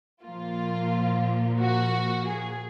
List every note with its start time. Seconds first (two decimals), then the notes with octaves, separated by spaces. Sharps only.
0.24 A#2 F3 A#3 F4
1.60 F#4
2.26 G#4